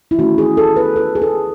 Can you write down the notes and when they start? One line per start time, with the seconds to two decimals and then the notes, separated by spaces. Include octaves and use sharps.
0.11 E4
0.18 D#3 A3 C#4 F#4
0.38 G#4
0.57 A4
0.76 B4
0.96 A4
1.15 G#4
1.22 A4